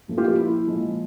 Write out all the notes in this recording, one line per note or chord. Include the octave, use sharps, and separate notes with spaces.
A#2 F3 A3
F4 G4
F4
E4
A#2 F3 G#3